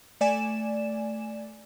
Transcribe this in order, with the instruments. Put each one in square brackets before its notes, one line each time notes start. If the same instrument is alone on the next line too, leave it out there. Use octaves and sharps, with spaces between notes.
[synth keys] A3 D5 G#5 E7